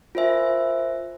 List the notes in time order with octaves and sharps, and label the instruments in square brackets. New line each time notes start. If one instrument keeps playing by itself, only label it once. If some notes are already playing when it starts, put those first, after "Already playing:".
[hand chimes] F4 A#4 C5 E5 G#5